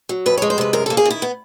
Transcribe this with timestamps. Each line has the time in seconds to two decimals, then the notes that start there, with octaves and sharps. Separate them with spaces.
0.09 F#3
0.26 F2 B4
0.38 G#3 C#5
0.50 C5
0.58 C3 B4
0.73 F#2 A#4
0.86 A#3 A4
0.97 G#4
1.05 D#3 E4
1.22 B3